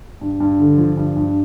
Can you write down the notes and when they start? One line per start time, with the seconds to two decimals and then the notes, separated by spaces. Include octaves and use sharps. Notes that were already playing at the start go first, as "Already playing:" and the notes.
0.21 G2
0.40 G2
0.59 D3
0.77 F3
0.97 G2
1.16 G2